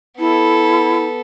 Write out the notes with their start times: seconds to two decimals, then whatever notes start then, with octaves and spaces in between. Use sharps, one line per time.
0.19 B3 E4 A4